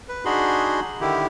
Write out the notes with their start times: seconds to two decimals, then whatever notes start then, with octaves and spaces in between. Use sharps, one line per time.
0.09 B4
0.25 D4 D#4 F#4 G#4 B5 C6
1.01 D3 D#3 E4 G4